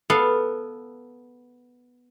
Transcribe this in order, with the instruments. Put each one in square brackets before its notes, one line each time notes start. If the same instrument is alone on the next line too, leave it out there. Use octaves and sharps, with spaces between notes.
[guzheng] B3 A4 F5